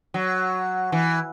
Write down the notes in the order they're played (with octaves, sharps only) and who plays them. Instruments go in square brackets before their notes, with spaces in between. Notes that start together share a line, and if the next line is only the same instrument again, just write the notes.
[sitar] F#3
E3